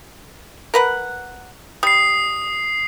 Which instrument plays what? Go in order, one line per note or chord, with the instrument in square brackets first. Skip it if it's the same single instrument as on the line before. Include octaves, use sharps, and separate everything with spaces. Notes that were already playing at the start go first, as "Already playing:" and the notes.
[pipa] A#4 B4 F#5
[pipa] G3 [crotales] D#6 C7